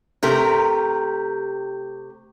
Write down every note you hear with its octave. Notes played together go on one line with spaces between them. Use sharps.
C3 A3 G4 A#4